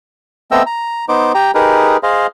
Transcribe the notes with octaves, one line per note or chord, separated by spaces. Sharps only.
A3 B3 C4 D#5 G5 E6
A#5
B3 D#4 C5 D6
G4 G5 A#5
D#4 G4 G#4 A#4 B4
G#4 C5 D#5 F5